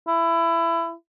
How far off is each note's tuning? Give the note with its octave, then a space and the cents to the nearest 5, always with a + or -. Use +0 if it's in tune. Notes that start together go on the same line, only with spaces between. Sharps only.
E4 +20